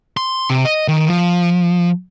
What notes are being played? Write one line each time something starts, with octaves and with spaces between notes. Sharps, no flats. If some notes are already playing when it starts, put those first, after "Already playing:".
C6
C3
D#5
D#3
F3